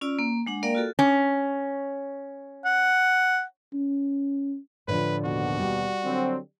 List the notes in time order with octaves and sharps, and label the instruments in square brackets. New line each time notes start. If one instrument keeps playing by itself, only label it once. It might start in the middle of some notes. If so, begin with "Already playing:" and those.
[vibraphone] C#4 F4 D5 E6
A#3
G#3 D4 F#5
A#3 A#4 D5 F5 G5
F4 F#4 A4
[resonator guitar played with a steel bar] C#4
[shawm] F#5
[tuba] C#4
[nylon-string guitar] A2 D3 F3 [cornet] B4
[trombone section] D#2 B2 [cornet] F#4
[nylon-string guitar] G3 D5
[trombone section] D3 F#3 C4